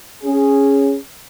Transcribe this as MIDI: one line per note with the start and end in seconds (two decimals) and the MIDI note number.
0.23 0.96 61
0.23 0.96 68